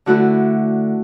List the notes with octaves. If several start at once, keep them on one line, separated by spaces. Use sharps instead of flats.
D3 A3 E4 F#4